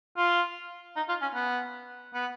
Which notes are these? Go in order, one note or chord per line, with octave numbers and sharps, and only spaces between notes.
F4
D#4
F4
C#4
B3
B3